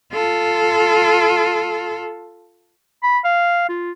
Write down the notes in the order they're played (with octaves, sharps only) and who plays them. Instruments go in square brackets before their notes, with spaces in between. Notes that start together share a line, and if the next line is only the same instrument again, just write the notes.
[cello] F4 A4
[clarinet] B5
F5
F4